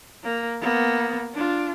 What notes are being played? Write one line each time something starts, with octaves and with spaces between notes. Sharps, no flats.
A#3
A#3 B3
D4 F4